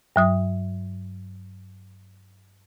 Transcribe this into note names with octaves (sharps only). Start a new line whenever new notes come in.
G2 F#3 D#6